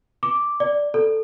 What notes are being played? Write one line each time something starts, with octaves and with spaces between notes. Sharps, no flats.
D6
D5
A4